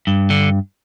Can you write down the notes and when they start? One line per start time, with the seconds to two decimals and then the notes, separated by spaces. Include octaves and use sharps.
0.07 G2
0.30 D3